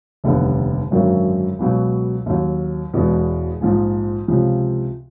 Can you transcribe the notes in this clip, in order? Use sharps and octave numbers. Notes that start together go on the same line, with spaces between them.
F1 D#2 D3 G3 B3
G#1 F#2 D3 F#3 A#3
C#2 B2 F#3
D#2 D#3 F#3
E1 E2 B2 G#3
A#1 G#2 F3
C#2 C3 F3